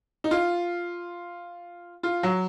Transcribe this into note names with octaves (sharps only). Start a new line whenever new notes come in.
D#4
F4
F4
F#3